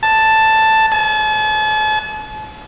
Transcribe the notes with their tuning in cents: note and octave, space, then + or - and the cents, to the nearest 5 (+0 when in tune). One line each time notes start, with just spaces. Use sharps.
A5 +0
A5 -45